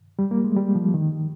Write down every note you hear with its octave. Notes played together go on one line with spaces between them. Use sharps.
G3
A#3
G#3
G3
F3
D#3